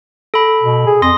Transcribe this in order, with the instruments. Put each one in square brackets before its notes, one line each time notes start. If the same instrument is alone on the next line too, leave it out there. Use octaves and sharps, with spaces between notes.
[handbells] A4 B5
[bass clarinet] B2
G#4
[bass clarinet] F2 [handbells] C6 D#6 A#6